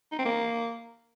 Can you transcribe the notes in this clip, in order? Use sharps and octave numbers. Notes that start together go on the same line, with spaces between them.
D#4
C4
A#3